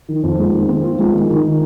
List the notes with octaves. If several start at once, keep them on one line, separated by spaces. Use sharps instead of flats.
D#3
F2
G#3
D#3
C4
F4
G#3
D#3
D#3